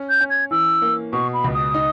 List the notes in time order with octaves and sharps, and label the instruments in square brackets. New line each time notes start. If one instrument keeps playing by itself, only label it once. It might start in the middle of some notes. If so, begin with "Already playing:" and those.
Already playing: [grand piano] C#4
[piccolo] G6
[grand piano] C#4
[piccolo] G#6
[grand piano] E3 [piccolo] E6
[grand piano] A#3
[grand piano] B2 [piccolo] C#6
[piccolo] B5
[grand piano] C#2
[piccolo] D#6
[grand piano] D#4